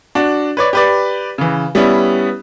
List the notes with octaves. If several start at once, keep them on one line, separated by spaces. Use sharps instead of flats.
D4 F#4
B4 C#5 D5
G4 B4 D5
C#3 E3
G3 B3 C#4 E4